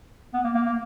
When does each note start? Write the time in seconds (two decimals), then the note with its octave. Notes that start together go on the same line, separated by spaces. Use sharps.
0.34 B3
0.44 A#3
0.55 A#3
0.66 A#3